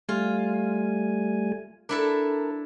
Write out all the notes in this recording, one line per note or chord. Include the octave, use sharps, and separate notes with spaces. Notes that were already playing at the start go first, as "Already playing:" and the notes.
G3 A3 F4 G#5
D4 E4 A4 A#4